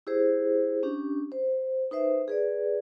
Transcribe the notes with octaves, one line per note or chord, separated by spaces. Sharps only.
E4 G4 G#4 C5
C#4 D4 G4
C5
D#4 B4 C5 E5
G#4 B4 D5